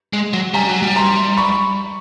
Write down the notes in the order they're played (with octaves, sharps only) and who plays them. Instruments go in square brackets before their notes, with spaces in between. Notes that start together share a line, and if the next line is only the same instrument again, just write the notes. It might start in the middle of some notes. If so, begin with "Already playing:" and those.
[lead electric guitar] G#3
F#3
[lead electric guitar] G3 [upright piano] G#5 A#5
[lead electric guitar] F#3
G3
[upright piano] A#5 C6
B5 C#6